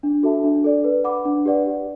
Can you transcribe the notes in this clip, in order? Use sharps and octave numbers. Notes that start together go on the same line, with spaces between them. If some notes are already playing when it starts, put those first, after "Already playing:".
D4
F#4 A4 E5 A5
D4
A4 D5
B4
F#5 B5 D6
D4
G4 B4 D5 F#5
G4